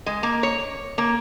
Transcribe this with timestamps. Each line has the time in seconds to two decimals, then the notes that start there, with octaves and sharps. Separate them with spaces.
0.06 G#3
0.23 A#3
0.43 C#5
0.98 A#3